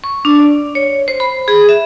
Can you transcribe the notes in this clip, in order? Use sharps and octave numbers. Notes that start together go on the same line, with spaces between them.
C#6
D4
D5
C#5
C5
B5
G#4
E5